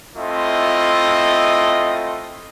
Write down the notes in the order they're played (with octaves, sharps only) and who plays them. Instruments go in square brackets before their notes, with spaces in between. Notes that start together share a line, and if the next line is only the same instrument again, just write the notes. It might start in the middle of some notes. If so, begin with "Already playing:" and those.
[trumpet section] A3 C4 E4 F4 D#5